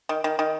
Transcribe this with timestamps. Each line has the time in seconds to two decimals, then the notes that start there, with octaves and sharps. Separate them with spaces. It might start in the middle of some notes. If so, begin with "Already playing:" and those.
0.09 D#3
0.24 D#3
0.39 D#3